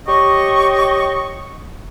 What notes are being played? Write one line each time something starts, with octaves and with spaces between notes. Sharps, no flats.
G4 C#5 D#5 C#6